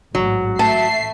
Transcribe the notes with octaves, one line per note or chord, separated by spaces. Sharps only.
A1 G#2 F#3
A1 A3 E5 A5 C7